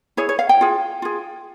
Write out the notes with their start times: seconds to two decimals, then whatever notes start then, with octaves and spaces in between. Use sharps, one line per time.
0.17 E4 G#4 C#5
0.29 C#5
0.39 F5
0.49 G5
0.61 F4 G#4
1.02 F4 G#4